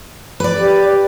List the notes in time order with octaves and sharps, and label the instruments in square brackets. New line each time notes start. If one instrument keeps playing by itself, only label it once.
[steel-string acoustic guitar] B4 D5
[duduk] G4